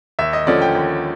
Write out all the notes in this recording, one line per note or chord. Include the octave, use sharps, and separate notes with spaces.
D#2 E5
D#5
D3 F3 A3 C#4 D5
G5
D#2